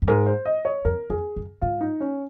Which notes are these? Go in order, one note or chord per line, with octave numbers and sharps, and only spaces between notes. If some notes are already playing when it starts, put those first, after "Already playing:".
F#2
G#2 A#4
C5
D#5
C#5
F2 A#4
F2 G#4
F#2
G#2 F4
D#4
C#4